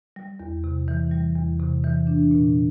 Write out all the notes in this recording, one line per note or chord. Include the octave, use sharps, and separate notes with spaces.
G3
E2
C3
E3
G3
E2
C3
E3
D4
A#2